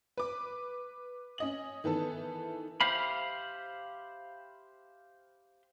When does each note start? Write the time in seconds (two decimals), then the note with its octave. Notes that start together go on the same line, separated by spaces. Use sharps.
0.18 B4 D6
1.38 C#4 D#5 F#7
1.84 D#3 E3 B3 A4
2.81 G4 C5 E5 F5 B5